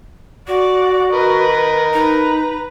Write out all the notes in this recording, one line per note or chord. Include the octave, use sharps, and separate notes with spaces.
F#4 D5 F#5
A#4 B4 D#5
D#4 B4 A#5